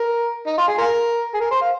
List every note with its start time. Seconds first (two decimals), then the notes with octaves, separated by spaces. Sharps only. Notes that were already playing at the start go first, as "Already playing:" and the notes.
Already playing: A#4
0.46 D#4
0.58 F4
0.68 G#4
0.78 F4 A#4
1.34 G#4
1.40 A#4
1.51 C5
1.61 F5